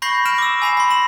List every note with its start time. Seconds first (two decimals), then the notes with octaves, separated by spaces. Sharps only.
0.02 B5 C#6 G6 A#6 C7 F#7
0.25 F6 A#6 D7 E7
0.38 D6 E6
0.62 G#5 B5 C7 E7
0.77 B5 C6
0.90 A#6 E7 F#7